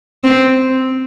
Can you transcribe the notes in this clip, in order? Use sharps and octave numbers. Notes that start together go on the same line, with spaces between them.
C4